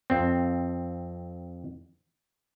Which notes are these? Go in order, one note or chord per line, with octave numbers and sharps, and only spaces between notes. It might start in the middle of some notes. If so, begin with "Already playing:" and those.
F2 C4